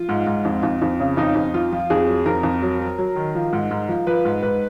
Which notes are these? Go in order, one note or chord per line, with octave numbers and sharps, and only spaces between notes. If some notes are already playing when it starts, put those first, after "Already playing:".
Already playing: F3 F4
G#2
G#2
F2
F2
F2
C#3
F2 D#4
F2
F3 F4
F3
F2 G#4
F#3
F2 A#4
F2
F#3
F#3
F#3
D#3
F3
G#2
G#2
F3
F3 B4
G#2
G#2 B4